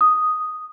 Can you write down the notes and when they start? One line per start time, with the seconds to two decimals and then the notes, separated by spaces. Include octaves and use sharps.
0.01 D#6